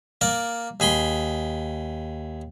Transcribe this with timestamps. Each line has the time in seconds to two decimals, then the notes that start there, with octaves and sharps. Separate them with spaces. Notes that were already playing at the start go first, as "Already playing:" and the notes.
0.21 A#3 A#4 D5
0.80 D#2 G#4 B5 C6